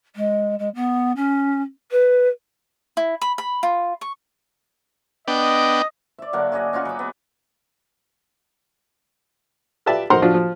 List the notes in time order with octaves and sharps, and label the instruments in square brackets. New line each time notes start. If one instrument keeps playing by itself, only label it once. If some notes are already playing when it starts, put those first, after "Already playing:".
[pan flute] G#3
G#3
B3
C#4
B4
[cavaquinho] E4
B5
B5
F4
C#6
[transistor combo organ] B3 D4 G5 [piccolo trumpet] D#5
[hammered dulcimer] D5 E5
D3 F#3 A#3 D4
F#4 G#4 D5 D#5
C#4 D#4 F4 F#4
F#3 B5 D6
B3
[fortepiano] F4 G4 B4 D5 E5 A5
D#4 A#4 C5 F#5 A#5 C6
F3 D4 F4 F#4
F3